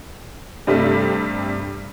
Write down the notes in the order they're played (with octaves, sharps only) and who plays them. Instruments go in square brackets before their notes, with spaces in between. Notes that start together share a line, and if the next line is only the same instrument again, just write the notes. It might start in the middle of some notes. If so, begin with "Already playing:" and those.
[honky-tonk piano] G2 C3 G3 A3